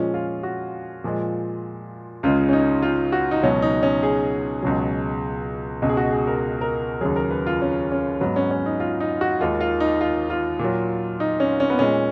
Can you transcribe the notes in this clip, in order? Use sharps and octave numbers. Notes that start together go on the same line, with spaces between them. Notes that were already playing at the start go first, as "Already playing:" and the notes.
Already playing: A#2 F3 G#3 C#4
F4
F#4
A#2 F3 G#3
C#2 C#3 G#3 F4
C#4
D#4
F4
F#4
D#4
C#2 B2 F#3 C#4
D#4
C#4
G#4
C#2 B2 F#3
C#2 B2 G#3
G#4
F#4
G#4
A#4
A#4
D#2 C#3 F#3 G#4
A#4
B4
F4
C#4
C#4
G#2 F#3 B3
C#4
C#4
D#4
F4
D#4
F#4
D#2 D#3 G#3 F4
F4
D#4
F4
F4
A#2 F#3
D#4
C#4
C#4
B3
A#2 G#3 C#4